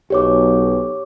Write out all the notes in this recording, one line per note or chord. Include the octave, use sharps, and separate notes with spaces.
B1 G4 C#5 D6